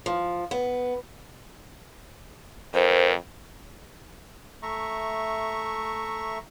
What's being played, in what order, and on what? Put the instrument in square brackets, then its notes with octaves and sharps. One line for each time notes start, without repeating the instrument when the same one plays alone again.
[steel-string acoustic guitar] F3
B3
[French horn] F2 [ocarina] A#4 [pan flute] C5
[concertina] A3 E5 A#5 C#6